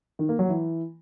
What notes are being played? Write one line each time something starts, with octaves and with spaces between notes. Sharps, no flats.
D#3
A#3
F#3
E3